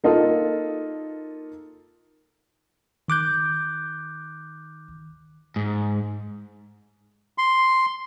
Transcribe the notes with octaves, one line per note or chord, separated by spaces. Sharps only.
A#3 D#4 F4 A4
D#3 D6 F#6 G6
G#2
C6